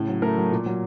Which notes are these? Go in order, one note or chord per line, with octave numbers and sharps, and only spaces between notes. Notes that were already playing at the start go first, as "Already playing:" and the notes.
Already playing: A2 C#3
F#3
A3 A#4
F#3
A#2
F#3